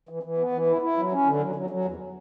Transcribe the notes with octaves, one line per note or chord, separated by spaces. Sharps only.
E3
E3
B3
E3
E4
E4
F#3
C#4
D3
F#3
F#3
F#3
E2